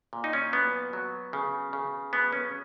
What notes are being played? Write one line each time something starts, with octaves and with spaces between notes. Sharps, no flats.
A#2
D#4
C#4
F#3 B3
F#3
C#3
C#3
F#3 B3
C#4